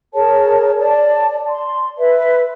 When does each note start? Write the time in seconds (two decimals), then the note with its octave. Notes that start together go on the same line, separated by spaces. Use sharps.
0.15 G#4 A#4 C#5 A5
0.78 D5 A5
1.47 C6
1.98 B4 E5